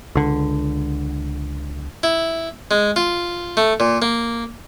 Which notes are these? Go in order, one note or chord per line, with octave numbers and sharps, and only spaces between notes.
C#2 D3
E4
G#3
F4
A3
A#2
A#3